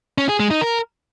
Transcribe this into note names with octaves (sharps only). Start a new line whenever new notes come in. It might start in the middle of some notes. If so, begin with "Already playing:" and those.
C#4
G#4
G#3
D#4
A#4